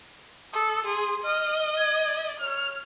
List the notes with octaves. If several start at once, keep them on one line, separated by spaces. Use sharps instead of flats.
A4 D#6
G#4 C6
D#5 F6
G#6
C#5 F6